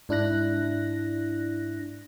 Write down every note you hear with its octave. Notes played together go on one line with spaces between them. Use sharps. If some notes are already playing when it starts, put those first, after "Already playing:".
G#2 D4 E4 F#6 A#6